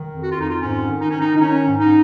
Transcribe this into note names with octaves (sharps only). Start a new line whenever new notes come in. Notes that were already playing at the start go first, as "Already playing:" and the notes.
Already playing: D#3
F2
F#4
F4
F2
D#4
F4
G#2 C#4
D#3
D#4
D#3 C#4
D#4
D#4
D#3 C#4
G#2
D#4